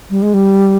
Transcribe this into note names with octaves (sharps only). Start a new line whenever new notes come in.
G3
G#3
G3